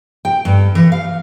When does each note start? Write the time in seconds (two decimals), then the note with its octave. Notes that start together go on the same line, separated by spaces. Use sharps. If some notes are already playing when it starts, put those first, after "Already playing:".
0.25 G5
0.45 G2
0.75 E3
0.92 F5